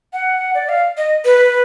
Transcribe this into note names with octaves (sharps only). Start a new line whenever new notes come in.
F#5
D5
F5
D#5
B4